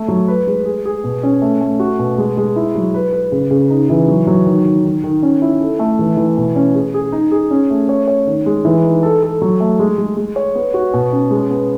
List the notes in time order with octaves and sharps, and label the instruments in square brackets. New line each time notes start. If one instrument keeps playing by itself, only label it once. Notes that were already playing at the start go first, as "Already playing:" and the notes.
Already playing: [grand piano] A3
F#3
B4
G#3
G#4
G#4
B2
C#4
A3
A3
F#4
B2
G#3
G#3
E4
F#3
B4
B4
C#3
C#3
D#4
E3
F#3
F#3
D#3
D#3
D#3
D#3
C#4
E4
A4
A3
E3
E3
B2
C#4
G#4
G#4
D#4
G#4
C#4
A3
C#5
C#5
D#3
G#3
E3
D#4
A4
A4
F#3
A3
G#3
G#3
G#3
C#5
B3
F#4
B2
C#4
G#3
B3